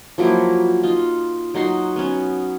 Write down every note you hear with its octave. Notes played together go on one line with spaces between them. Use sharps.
F3 F#3 A#3 E4
D#4 F4
F#3 D#4 F#4 C6
B3 C#4